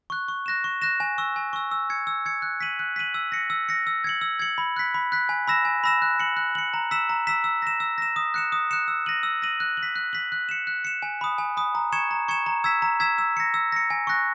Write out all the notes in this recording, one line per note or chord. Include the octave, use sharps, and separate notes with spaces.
C#6 F#6
C#6
F#6 A#6 E7
C#6
F#6 A#6 E7
G#5
C#6 E6
G#5
C#6 E6
E6
G#6 C#7
E6
G#6 C#7
F#6
B6 D#7 F#7
F#6
B6 D#7 F#7
E6
A#6 C#7
E6
A#6 C#7
E6
G#6 C#7 F#7
E6
G#6 C#7 F#7
B5
F#6 B6
B5
F#6 B6
G#5
B5 E6 A#6 E7
G#5
B5 E6 A#6 E7
F#6
C#7 F#7
F#6
C#7 F#7
A#5
E6 B6 E7
A#5
E6 B6 E7
E6
A#6 E7
E6
A#6 E7
D#6
F#6 C#7 E7
D#6
F#6 C#7 E7
E6
A#6 D#7 F#7
E6
A#6 D#7 F#7
F#6
F#7
B6
F#6
B6 F#7
F#6
C#7 E7
F#6
C#7 E7
G#5
B5 D#6
G#5
B5 D#6
A#5
C#6 G#6 C#7 E7
A#5
C#6 G#6 C#7 E7
A#5
E6 G#6 B6 E7
A#5
E6 G#6 B6 E7
E6
A#6 C#7
E6
A#6 C#7
G#5
C#6 F#6 A#6